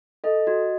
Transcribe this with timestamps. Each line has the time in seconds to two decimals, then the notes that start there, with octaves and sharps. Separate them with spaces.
0.24 A4 D#5
0.47 F#4